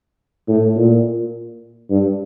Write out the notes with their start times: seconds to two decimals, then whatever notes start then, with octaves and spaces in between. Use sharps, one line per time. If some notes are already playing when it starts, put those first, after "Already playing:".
0.48 A2
0.76 A#2
1.90 G2